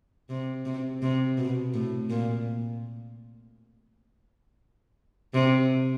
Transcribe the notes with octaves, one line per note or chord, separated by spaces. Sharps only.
C3
C3
C3
B2
A2
A#2
C3